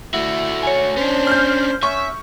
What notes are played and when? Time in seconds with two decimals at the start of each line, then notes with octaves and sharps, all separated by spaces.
0.14 A3 E4 F#4
0.63 C#5 G#5
0.97 C#4 D4 C5
1.27 F6 G6
1.83 C#4 E5 C#6